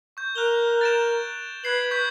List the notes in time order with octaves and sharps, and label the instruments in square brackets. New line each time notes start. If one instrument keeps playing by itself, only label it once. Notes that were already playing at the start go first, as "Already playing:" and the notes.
[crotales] C#6 G6
[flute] A#4 [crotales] F#6 F7 G7
[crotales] A6 D7 E7
[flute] B4 [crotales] G#6 C7 F#7
[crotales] C#6 G6 B6